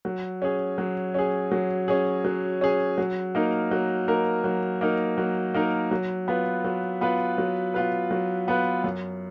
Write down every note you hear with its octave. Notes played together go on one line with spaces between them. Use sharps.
F#3
C#4 G#4
F#3
C#4 G#4
F#3
C#4 G#4
F#3
C#4 G#4
F#3
A#3 D#4 A#4
F#3
A#3 D#4 A#4
F#3
A#3 D#4 A#4
F#3
A#3 D#4 A#4
F#3
B3 F4 B4
F#3
B3 F4 B4
F#3
B3 F4 B4
F#3
B3 F4 B4
F#2